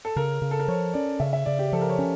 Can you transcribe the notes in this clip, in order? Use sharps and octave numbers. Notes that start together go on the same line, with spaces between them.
A4
C#3 A#4
C#3
A4
A#4
F3 C#5
C#4 D5
C#3 E5
E5
C#3 D5
G4
F3 A4
A#4
C#5
C#4